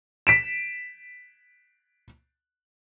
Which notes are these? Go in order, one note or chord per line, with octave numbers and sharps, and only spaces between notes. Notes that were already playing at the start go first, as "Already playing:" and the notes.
B6 D7 E7